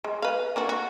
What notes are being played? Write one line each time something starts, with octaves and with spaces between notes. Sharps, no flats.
G#3
B4 F5
A#3 D4 F#4
F#4